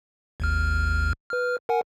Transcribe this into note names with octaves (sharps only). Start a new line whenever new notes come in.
G#1 D#2 F6
B4 F6
A#4 F#5 G#5